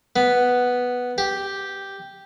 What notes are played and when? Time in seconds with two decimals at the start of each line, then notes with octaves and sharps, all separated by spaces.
0.16 B3
1.18 G4